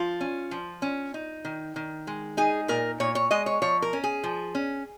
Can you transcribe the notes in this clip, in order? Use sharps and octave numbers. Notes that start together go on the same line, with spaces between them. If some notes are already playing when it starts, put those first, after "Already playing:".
Already playing: F3 F4
C#4
F3
C#4
D#4
D#3
D#3
G#3
D#4 G#4
A#2 A#4
A#2 C#5
C#5
G#3 D#5
C#5
F3 C#5
A#4
C#4
G#4
F3
C#4